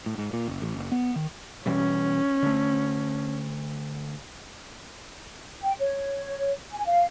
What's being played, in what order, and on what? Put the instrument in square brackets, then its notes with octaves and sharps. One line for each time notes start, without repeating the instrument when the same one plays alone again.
[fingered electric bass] A2
G#2
A#2
F#1
A1
F#1
B3
D#3
[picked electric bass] B2 E3 G3 [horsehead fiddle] C#4
[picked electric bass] D3 A3
[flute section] G5
C#5
G#5
F5